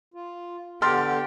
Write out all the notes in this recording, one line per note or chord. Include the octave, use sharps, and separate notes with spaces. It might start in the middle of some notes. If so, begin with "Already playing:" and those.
F4
D3 B3 G4 A4 C6 F6 A6